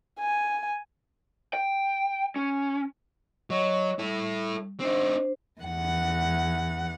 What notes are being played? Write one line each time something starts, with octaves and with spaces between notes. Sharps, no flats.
G#5
G5
C#4
F#3 C#5 D#5 C#6
G3 E4 A4
C4 D4 D#4 C5
E2 F#5